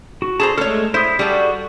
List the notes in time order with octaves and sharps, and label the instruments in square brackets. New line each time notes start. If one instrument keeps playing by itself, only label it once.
[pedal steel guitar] F#4
[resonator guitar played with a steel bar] G#4 A4 A#5 [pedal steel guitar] C5 A5
[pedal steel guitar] G#3 A3 F6 [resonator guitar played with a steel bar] A4 C#5
[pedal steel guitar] E4 D#6 [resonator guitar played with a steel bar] C5
[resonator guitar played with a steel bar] G3 G#4 A4 [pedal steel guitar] F#4